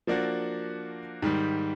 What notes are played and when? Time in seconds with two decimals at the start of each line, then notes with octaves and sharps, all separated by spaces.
0.07 F3 A#3 D4 F#4
1.22 G#2 D#3 G3